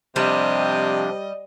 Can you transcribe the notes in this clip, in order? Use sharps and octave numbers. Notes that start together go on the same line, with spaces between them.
C3 F3 G3 D4 D#5